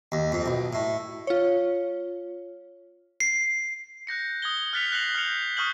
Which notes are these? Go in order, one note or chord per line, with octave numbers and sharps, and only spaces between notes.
D#2
F2
B1
A2
F4 C#5
C7
F#6 G6 A#6 C#7
D#6 G#6 G7
F6 F#6 A6 B6 C#7 F7
F#6 A#6 C7 F7 F#7
F6 G6 A#6 C#7 F7
C#6 D#6 F6 G6 F#7 G7